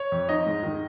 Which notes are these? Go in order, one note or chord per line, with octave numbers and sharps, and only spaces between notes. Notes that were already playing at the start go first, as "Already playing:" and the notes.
Already playing: C#5
F2
D#4 D#5
G#2
D#3